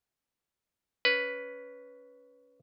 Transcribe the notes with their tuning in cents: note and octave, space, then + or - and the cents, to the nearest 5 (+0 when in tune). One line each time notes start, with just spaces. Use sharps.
C#4 +15 B4 +0